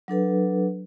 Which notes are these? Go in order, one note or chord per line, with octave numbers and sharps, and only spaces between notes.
F#3 D4 A4 B4